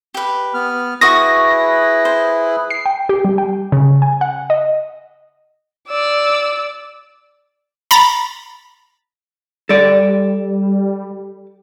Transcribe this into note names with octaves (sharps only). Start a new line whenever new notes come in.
G4 B4
B3 F6
E4 F#4 G#4 B4 C#6 D#6 A#6
C5
C7
G5
G4
G3
G5
C#3
G#5
F#5
D#5
D5 E6
A#5 B5 A6 A#6
G3 A4 D5